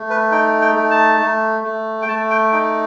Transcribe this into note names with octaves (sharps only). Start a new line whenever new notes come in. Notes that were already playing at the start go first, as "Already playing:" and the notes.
Already playing: A3
B4
D#4 G5
G5
A3
A5
A3
A3
G5
A3 A5
G5
D#4 G5